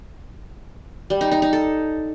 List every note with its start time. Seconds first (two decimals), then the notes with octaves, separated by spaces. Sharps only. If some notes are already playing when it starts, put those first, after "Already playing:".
1.10 G3
1.21 D#4
1.31 D#4
1.42 D#4
1.53 A4